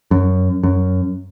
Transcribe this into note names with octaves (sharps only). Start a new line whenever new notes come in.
F#2
F#2